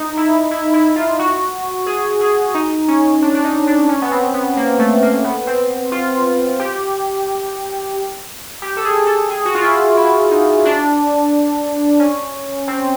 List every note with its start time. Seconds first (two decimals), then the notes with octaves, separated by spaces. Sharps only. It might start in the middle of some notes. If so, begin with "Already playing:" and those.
Already playing: D#4
0.17 E4
0.51 E4
0.74 E4
0.96 F4
1.19 F#4
1.86 G#4
2.21 G#4
2.55 D#4
2.88 C#4
3.22 D4
3.35 D4
3.44 D#4
3.67 D4
3.89 C#4
4.02 B3
4.11 C4
4.34 B3
4.57 A#3
4.79 A3
5.02 A#3
5.24 B3
5.47 C4
5.92 F4
6.60 G4
8.62 G4
8.77 A4
8.85 G#4
9.07 A4
9.30 G#4
9.45 F#4
9.55 F4
9.63 E4
9.97 E4
10.31 D#4
10.65 D4
12.00 C#4
12.68 C4